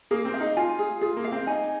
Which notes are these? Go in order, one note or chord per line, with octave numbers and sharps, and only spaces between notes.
A#3 G#4
C4
F5
D#4
F4 G#5
G#4
F4 G#4
A#3
F5
C4
D#4 G#5